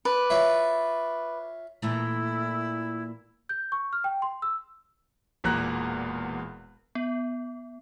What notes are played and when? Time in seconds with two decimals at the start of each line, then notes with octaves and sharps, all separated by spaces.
0.05 B4 D5
0.30 F4 C#5 E5
1.82 A#2 E3 A3 E4
3.49 G6
3.72 C#6
3.93 F6
4.04 G5
4.22 C6
4.42 E6
5.44 E1 E2 A#2 A#5 F#6
6.95 B3